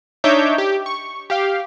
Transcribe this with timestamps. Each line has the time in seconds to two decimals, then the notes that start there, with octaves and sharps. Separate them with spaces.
0.24 D4 D#4 C#5 E5 D6 G6
0.58 G4
0.86 C#6
1.30 G4 F5